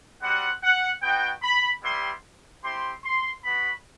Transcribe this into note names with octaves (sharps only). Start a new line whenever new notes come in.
G3 C4 F#4 F#5
F#5
B3 D#4 F#4 G5
B5
G3 B3 E4 G4 C6
C4 E4 G4 C6
C6
B3 F#4 B5